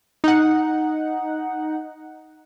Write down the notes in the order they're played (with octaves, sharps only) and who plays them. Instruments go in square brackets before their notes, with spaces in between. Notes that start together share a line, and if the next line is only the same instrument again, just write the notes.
[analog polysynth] D#4 F#5